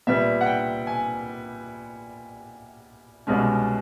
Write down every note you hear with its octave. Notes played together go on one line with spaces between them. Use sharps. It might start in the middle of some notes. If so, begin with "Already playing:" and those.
A#2 G3 B3 E5
F#5
G5
G#5
C2 B2 G#3 C#4